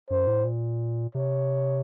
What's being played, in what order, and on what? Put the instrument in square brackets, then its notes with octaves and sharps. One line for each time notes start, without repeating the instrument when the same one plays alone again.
[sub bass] F#2 [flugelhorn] C5
[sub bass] A2
A#2
[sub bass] C3 [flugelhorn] C#5